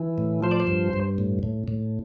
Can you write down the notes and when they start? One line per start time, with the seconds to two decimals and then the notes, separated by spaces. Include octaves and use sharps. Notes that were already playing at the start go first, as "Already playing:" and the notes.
Already playing: E3
0.18 A2
0.43 F3 C5
0.51 D5
0.60 C5
0.67 G2
0.93 G2
1.18 A2
1.43 A2
1.68 A2